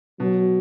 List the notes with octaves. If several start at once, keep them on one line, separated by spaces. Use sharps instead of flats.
B2 F#3